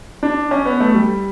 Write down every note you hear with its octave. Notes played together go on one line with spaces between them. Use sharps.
D4
C#4
B3
A3
G3